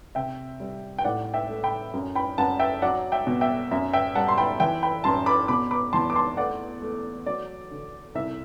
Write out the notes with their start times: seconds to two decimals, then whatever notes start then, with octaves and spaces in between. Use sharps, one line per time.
0.15 C3 E5 G5
0.60 G3
0.98 G5
1.04 A2 D5 F#5
1.34 E5 G5
1.49 A3
1.64 G5 B5
1.94 F#2
2.15 G5 B5
2.38 F#2 F#5 A5
2.59 E5 G5
2.82 F#3 D5 F#5
3.12 E5 G5
3.27 B2
3.41 E5 G5
3.71 F#2 E5
3.93 E5 G5
4.15 G3 F#5 A5
4.28 C6
4.38 G5 B5
4.60 E3 E5 G5
4.83 G5 B5
5.04 F#2 A5 C6
5.26 B5 D6
5.48 B2 B5 D6
5.71 B5 D6
5.93 E2 A5 C6
6.10 D6
6.15 A5 C6
6.37 A3 D5 F#5
6.82 A3
7.26 F#3 D5
7.71 D3
8.15 C2 E5